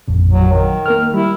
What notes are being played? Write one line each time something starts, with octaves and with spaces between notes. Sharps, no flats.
A1 F2 A#2
F#3
D#3
A#3 A#4 F6
G3 E4